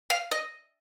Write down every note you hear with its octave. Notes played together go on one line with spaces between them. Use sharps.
F5
D#5